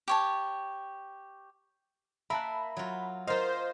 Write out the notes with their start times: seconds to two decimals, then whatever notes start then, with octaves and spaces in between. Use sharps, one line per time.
0.08 G4 C#5 A5
2.30 A#3 E5 A5 B5 F#6
2.77 F#3 F4
3.27 F4 A#4 C5 D#5 F5